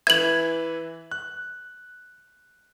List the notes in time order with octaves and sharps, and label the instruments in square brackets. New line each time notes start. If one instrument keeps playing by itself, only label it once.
[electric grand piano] E3 B4 E5 [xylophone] G#6 F#7
[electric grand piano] F#6